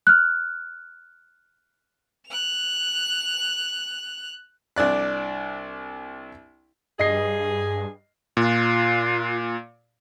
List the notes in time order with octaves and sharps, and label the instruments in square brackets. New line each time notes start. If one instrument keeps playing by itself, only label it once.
[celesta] F6 F#6
[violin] F#6 F7
[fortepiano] C2 D4 D5 F#6
[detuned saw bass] G2 [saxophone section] G#4 [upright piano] D#5 C7
[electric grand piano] A#2 [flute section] F4 F#6